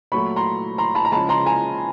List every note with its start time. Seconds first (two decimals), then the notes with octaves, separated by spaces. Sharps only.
0.12 A#2 F#3 A3 B5 C#6
0.36 A#5 C6
0.78 A#5 C6
0.95 A5 B5
1.05 A#5
1.12 C#3 F3 G#3 A5 B5
1.29 A#5 C6
1.46 G#5 A#5